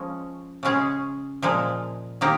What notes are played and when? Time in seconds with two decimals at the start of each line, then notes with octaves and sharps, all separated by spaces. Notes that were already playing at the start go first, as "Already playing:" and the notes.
Already playing: F3 G#3 C#4
0.63 C#3 G#3 C#4 G#4
1.42 A#2 F3 G#3
2.21 D#3 A#3 D#4 G4